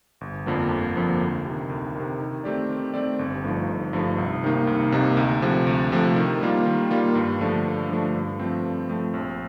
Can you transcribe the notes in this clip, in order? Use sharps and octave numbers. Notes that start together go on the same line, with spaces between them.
G1
F2 D3 F3 A#3
G1
F2 D3 F3 A#3
D2
C3 D#3
D2
C3 D#3
D#3
A3 C4 G4 D5
D#3
A3 C4 G4 D5
G1
G2 F3 A3 D#4
G1
G2 F3 A3 D#4
C2
C3 D#3 A#3 D#4
C2
C3 D#3 A#3 D#4
D2
C3 F3 A3
D2
C3 F3 A3
D#3
G3 A#3 F4
D#3
G3 A#3 F4
G2
D3 F3 A3 D4
G2
D3 F3 A3 D4
G2
F3 A3 C4
G2
F3 A3 C4
A#1